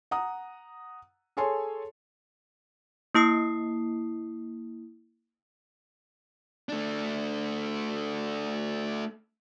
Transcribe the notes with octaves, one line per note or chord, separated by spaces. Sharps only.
F#5 A#5 D#6
G#4 A4 C#5 G#5 A5 C6
A#3 E4 D#6 C7
A3 D4